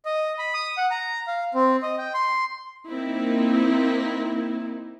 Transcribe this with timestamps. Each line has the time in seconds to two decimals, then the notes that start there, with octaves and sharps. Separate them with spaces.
0.05 D#5
0.38 B5
0.54 D#6
0.77 F#5
0.91 A#5
1.28 F5
1.54 C4
1.83 D#5
1.98 G5
2.14 C6
2.88 A#3 C4 D#4 E4